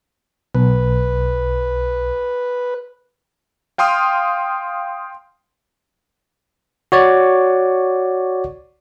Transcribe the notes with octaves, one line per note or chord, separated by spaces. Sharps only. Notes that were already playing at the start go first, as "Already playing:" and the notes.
B1 B4
F5 G5 C6 D#6 F6
F#4 C#5 D5